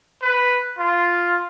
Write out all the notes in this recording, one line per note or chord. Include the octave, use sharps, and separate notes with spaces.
B4
F4